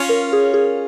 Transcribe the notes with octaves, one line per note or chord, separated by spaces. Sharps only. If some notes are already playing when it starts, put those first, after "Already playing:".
Already playing: C#4 F4 C#5
A#4
G#4
G#4